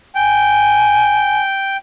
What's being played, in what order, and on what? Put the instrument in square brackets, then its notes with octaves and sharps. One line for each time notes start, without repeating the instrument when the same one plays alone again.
[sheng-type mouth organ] G5 [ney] G#5